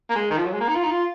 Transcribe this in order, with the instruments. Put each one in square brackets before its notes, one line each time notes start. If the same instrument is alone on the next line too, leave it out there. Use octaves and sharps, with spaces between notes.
[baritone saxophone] A#3
G#3
D#3
F3
F#3
G#3
A#3
D#4
F4
D#4
F4